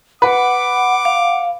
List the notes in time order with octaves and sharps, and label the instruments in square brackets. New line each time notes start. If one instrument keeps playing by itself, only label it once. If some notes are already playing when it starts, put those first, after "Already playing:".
[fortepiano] B4 [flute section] F#5 [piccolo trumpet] D6
[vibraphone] F5